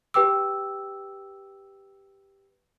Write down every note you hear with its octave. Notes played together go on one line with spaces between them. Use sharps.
G4 B4 G5 D6 E6